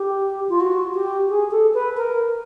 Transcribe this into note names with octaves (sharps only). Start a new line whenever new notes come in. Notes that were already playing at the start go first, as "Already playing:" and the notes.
Already playing: G4
F4
F#4
G4
G#4
A4
B4
A#4